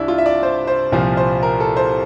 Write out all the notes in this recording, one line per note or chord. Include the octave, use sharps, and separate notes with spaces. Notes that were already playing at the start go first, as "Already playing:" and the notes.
Already playing: C2 D4 E4
F4
E5
D5
C5
C5
C2 A#2 F3 C5
C5
A#4
A4
C5